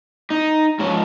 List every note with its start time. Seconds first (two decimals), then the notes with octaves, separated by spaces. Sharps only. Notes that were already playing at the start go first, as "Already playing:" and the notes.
0.30 D#4
0.79 G#2 F3 C#4